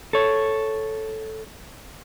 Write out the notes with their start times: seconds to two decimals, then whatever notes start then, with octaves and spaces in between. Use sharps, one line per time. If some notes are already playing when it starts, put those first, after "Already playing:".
0.13 A4 C#5